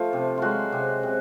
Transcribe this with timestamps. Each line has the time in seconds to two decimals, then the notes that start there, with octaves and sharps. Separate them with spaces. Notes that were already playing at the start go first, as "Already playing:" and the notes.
Already playing: F3 A3 F4
0.13 C3
0.38 F#3 G#3 F4 F#4
0.72 C3
1.03 C3